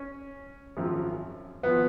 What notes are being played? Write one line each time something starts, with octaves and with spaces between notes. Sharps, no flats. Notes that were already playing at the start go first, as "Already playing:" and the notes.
Already playing: C#4
G#1 F#2 F3
G#1 F3 B3